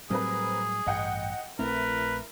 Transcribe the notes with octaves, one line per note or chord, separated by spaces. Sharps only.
A2 F#3 G3 C4 G#4 A#4 B4
A1 G2 D#5 F#5 G5
A#1 A3 C4 E4 A#4 B4